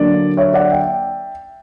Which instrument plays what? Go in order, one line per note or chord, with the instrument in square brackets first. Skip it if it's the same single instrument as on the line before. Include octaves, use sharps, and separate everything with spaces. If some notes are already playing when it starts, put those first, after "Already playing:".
Already playing: [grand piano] D3 F#3 A#3 D4 D5
C#5 E5
D5 F#5
E5 G5